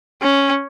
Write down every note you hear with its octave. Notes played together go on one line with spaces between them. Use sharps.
C#4